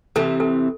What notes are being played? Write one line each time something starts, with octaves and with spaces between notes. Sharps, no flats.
C3 E3 A4
A4